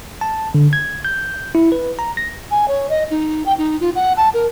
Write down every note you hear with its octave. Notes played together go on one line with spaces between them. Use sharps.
A5
D3
G#6
G6
E4
B4
A#5
A#6
G#5
C#5
D#5
D#4
G5
D#4
F4
F#5
A5
A#4